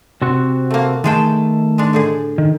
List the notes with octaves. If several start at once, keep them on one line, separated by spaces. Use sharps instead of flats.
C3 C4 F#4
A3 A#3
D#3 G#3 A3 G#4 G5 A5
G#3 D4
A2 D3 G#4
D#3